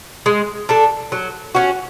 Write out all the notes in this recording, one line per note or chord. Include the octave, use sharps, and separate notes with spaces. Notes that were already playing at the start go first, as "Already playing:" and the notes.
G#3
D4 A4
F#3
C#4 F#4